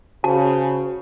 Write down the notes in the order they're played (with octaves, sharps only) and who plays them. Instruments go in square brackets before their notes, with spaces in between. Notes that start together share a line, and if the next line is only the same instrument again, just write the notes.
[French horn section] C#3 [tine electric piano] F#4 [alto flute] C5 [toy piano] A5